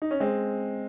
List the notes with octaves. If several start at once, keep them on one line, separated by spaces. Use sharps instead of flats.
D#4
C#4
G#3 C4